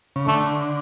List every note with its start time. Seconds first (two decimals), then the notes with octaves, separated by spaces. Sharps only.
0.16 C#3
0.27 D3 A3